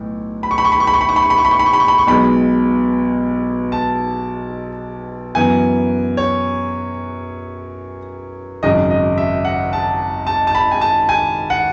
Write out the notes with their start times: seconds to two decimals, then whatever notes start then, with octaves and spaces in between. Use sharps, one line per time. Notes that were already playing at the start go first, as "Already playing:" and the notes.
Already playing: B1 A2
0.43 B5
0.51 C#6
0.58 B5
0.65 C#6
0.72 B5
0.80 C#6
0.87 B5
0.93 C#6
1.01 B5
1.09 C#6
1.16 B5
1.22 C#6
1.30 B5
1.38 C#6
1.45 B5
1.51 C#6
1.59 B5
1.66 C#6
1.73 B5
1.80 C#6
1.88 B5
1.98 C#6
2.07 B1 B2 G#3 B5
3.72 A5
5.35 F#2 E3 B3 G#5
6.17 C#5
8.63 G#1 F#2 C#3 D#5
8.91 D#5
9.18 E5
9.45 F#5
9.73 A5
10.27 A5
10.47 A5
10.55 B5
10.71 G#5
10.81 A5
11.09 G#5
11.50 F#5